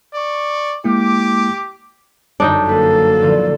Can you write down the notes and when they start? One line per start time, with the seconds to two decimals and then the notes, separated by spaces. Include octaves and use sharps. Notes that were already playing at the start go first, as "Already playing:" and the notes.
0.14 D5 C#6
0.84 G#3 A#3 E4 G4 D6
2.40 G1 F#2 D4 D#4 G5
2.69 A#3 A4 B4
3.21 A1 D3 F3